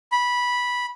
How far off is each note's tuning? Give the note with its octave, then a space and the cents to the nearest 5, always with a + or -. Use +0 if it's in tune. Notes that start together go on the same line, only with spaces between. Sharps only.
B5 -10